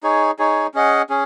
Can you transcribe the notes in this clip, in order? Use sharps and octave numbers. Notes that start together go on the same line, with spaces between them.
D#4 G#4 C#5
D#4 G#4 C#5
C#4 G#4 D#5 F#5
C#4 G#4